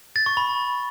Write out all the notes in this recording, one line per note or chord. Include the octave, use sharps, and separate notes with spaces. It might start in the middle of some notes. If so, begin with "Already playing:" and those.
A6
C#6
B5